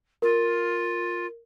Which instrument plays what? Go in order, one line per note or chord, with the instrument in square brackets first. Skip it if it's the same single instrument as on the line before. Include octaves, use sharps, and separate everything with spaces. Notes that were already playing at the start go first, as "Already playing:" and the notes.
[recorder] F4 [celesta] A#4